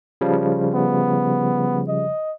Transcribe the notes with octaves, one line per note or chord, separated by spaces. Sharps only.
C#3 F3 G3
B3
D#5